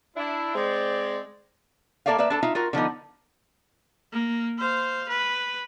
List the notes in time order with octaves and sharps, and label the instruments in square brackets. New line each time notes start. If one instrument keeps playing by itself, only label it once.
[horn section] D4 E4
G#3 C4 D5
[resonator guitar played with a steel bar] A#3 B3 A4 D5 E5 F5
A#3 B4 D5 E5
D4 A4 A5
D#4 F4 E5
F4 F#4 A#4
D3 F3 B3 D#4
[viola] A#3
C5 F5
B4